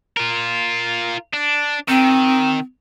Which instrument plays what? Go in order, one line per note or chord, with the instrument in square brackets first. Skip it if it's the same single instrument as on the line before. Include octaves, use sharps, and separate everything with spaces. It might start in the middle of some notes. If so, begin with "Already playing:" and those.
[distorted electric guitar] F4 A#4
D4
[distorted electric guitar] D#3 [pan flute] C4